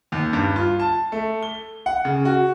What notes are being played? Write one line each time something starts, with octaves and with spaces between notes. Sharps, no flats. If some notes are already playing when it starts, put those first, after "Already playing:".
D#2
G2
F4
A5
A3
G7
F#5
C#3
F#4